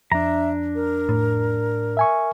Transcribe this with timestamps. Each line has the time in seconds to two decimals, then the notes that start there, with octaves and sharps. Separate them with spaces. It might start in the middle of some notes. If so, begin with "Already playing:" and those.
0.12 F2 D4 E5 A#5
0.75 A#4
1.09 A2
1.97 E5 G#5 C#6